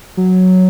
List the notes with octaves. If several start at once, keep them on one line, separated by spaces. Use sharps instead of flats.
F#3